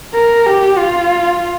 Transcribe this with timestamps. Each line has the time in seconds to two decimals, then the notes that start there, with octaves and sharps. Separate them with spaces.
0.14 A#4
0.46 G4
0.78 F4